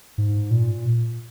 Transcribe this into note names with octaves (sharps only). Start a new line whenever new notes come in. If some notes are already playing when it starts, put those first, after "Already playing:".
G#2
A#2